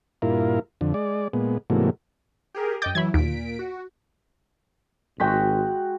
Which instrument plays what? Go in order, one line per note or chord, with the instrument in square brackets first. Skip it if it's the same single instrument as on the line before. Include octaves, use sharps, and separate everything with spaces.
[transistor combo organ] G2 A#2 E4 F4 A#4
F2 D3
G#3 D5
A#2 G#3 B3
G#2 C3 E3 F#3 A3 A#3
[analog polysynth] G4 G#4 A#4
[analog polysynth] F#2 D#5 G5 [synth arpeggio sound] D6 G6 A6
[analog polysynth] E3 F#3 E4 [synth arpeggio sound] B5 G#6
[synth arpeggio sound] D#2 [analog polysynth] A#2 B6 D7
[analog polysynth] F#4
[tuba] G#1 [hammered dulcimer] G#3 F#4 [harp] G5 B6